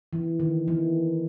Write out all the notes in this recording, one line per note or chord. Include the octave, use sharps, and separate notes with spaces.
E3
D#3
E3